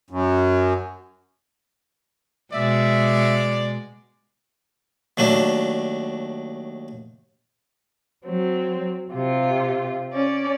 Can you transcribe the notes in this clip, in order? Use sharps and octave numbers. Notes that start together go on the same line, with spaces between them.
F#2
B2 G#3 D5 E5
D#2 F#3 A3 D4
F#3 C4
C3 F4
C#4 D5